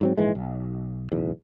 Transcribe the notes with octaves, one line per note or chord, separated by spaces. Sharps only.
G#2 F#3 C4
A#1 G#2 E3 G#3
B1
D1 B1 E2